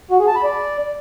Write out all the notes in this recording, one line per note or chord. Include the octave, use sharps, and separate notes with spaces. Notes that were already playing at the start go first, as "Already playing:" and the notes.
F#4
G#4
A5
B5
D5